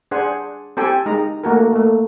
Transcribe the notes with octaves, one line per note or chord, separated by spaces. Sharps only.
D4 G#4 C5 F#5 G#5
C4 E4 G4 A4 G5 G#5
G#3 D#4 A#5
A3 A#3 F#4 A#4
A3 A#3